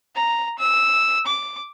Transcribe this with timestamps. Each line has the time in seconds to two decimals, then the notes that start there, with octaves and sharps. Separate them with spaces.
0.15 A#5
0.59 E6
1.26 D6